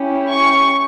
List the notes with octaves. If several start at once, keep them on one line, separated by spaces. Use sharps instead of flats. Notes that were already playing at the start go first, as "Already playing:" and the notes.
Already playing: C#4 E4 G4
C#6